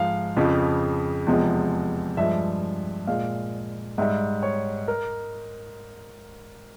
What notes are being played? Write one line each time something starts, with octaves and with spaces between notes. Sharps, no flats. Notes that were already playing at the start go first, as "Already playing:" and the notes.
Already playing: G#2 F3 G#3 F5
F2 C#3 F3
E2 C3 F3 G#3
G2 F3 G#3 E5
A#2 G#3 F5
G#2 G3 E5
C#5
A#4